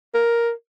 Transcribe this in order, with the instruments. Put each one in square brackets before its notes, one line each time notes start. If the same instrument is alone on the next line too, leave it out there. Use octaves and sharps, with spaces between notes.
[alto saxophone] A#4